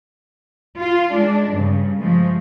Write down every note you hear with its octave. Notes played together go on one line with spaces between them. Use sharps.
F4
G#3 D4
G2 C#3
F3 G#3 A3